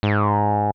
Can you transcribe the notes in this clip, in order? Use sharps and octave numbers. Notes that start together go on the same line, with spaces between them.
G#2